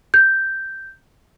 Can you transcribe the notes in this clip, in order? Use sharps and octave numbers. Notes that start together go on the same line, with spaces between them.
G6